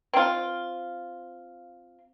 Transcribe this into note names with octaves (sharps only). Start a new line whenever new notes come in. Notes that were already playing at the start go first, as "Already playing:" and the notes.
C4 F4